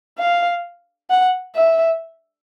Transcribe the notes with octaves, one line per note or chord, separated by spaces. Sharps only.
F5
F#5
E5